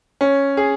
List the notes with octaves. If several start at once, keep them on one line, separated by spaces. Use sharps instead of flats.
C#4
G#4